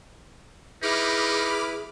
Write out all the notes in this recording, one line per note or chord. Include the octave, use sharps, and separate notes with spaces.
D#4 E4 G#4 B4 B5 D6 F6